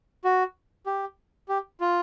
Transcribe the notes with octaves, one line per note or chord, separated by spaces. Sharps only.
F#4
G4
G4
F4